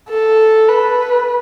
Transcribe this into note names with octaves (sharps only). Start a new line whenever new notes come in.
A4
B4